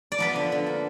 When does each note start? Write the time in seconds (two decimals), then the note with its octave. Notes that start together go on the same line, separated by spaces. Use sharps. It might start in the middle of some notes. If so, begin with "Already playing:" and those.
0.12 D5
0.18 F3 B3 B4
0.36 D3
0.52 D3
0.67 A#3